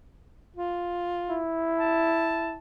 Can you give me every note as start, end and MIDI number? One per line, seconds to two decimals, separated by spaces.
0.56 1.40 65
1.30 2.57 64
1.78 2.58 81